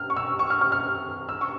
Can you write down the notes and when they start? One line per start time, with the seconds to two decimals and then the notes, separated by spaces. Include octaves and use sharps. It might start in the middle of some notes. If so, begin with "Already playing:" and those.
Already playing: F6
0.10 C#6
0.16 E6
0.39 C#6
0.50 F6
0.61 F6
0.72 F6
1.29 E6
1.41 C#6